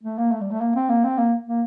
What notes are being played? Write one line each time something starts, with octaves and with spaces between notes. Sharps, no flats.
A3
A#3
A3
G3
A3
A#3
C4
A#3
C4
A#3
A#3